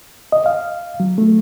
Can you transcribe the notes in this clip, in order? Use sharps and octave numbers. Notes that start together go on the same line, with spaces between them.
D#5
F5
F#3
A3